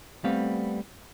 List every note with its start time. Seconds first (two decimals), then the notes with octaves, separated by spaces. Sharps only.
0.24 G3 A3 B3 C4 F5